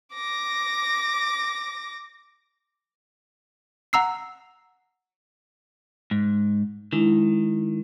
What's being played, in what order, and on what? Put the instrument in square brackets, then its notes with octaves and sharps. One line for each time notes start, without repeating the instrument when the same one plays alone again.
[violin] D6 A#6
[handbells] F#5 A#5 E6 C7
[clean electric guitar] G#2
[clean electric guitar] D#3 [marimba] G#3 D4 E4